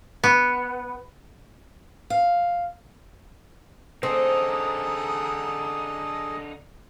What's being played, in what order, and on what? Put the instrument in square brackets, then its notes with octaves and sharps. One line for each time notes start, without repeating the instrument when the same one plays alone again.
[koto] B3
[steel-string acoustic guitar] F5
[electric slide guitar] D3 D#4 [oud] C4 [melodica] G#4 A4